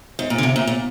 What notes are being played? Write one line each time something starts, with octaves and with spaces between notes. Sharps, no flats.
G#2
A#2
D3
C3
A#2
A#2